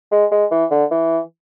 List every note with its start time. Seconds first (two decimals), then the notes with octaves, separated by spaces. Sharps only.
0.12 G#3
0.31 G#3
0.51 E3
0.71 D3
0.91 E3